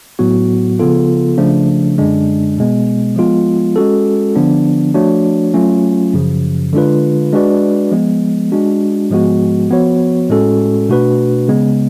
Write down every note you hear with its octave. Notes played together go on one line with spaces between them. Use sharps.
A2 F#3 B3 F#4
C#3 F3 B3 F4 A4
C#3 F3 A3 D4
F#2 D3 G#3 D4
B2 G#3 B3
F3 G#3 B3 F4
G#3 C#4 F#4 A4
D3 F3 B3 D4
F3 A3 D4 F#4 C#5
F#3 A3 C#4 F4
F#2 C#3 F3
D3 G#3 D4 F4 B4
G#3 D4 F#4 B4 D5
F3 G#3 B3
G#3 D4 F#4
G#2 F3 G#3 B3 F#4
F3 B3 F#4 C#5
A2 G#3 C#4 F#4 A4
B2 A3 D4 F#4 B4
C#3 G#3 B3